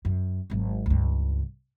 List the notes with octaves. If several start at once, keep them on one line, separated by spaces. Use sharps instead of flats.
F#2
G#1 F#3
C#2 G2